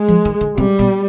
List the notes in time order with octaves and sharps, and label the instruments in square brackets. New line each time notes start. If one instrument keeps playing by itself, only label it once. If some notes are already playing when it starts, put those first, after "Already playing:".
Already playing: [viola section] G#3
[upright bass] F3
D#3
D3
[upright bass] C3 [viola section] G3
[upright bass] B2